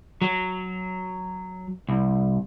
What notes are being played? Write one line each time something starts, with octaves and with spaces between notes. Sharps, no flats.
F#3
C2